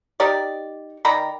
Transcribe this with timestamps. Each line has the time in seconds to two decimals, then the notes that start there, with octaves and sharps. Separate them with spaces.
0.20 D#4 G4 A#4 D5
1.05 D#3 D5 A#5 B5